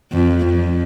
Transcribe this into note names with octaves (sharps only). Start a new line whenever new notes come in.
F2
F2